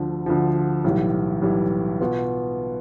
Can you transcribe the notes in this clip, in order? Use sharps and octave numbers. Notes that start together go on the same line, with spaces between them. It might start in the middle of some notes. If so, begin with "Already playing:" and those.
Already playing: D2 D3 F3
D2 D3 F3
B1 A2 E3 G3
B1 A2 E3 G3
B2 B3 F4